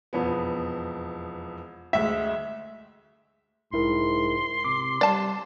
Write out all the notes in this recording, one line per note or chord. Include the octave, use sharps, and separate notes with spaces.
E1 F2 B3
D2 G#3 E5
B1 G#2 E4 A#4 C6
C3 D6
G3 D5 A5